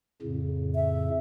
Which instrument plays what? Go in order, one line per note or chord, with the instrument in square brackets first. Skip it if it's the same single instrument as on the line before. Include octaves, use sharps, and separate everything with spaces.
[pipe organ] F2 A2 C#3
[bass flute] E5